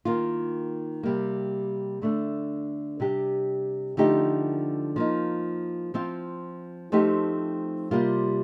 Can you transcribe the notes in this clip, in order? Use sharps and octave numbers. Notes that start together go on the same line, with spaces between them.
D#3 A#3 F4
C3 G3 A#3
D3 A3 D4
C3 G3 D4 G4
D3 F3 A3 D#4 G4
F3 A#3 D#4
F3 C4 F4
F3 A3 C4 D#4 G4
C3 G3 A#3 F4